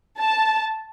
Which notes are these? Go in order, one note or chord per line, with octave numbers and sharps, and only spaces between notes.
A5